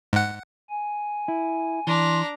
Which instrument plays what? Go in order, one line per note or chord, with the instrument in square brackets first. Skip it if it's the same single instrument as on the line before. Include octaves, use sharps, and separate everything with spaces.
[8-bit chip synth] G#2 F#5
[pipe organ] G#5
[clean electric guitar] E4
[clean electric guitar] E3 [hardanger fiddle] D4 A#5 [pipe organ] C6